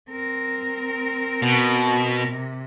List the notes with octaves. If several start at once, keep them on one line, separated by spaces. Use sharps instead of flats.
C4 A#4
B2
C3